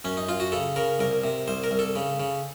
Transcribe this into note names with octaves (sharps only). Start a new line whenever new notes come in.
F#2 C#4
D#4
F#2 F4
F#4
C#3 A4
C#3 A#4
C2 A#4
C3
C2 C5
A#4
C2
A4
C#3
C#3